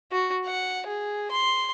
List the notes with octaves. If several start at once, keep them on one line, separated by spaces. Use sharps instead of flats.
F#4
F#5
G#4
C6